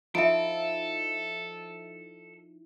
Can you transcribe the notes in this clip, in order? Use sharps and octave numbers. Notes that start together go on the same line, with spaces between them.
F3 D#4 E4 A4 E5 D7